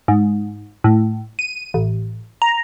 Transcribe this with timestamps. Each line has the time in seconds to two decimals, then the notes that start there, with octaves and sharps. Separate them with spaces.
0.08 G#2
0.84 A2
1.39 D#7
1.74 A1
2.42 A#5